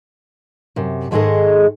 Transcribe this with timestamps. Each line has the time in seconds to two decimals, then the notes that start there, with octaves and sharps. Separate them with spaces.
0.76 F#2 C3
1.11 G#2 D#3 G#3 G#4 A4 D#5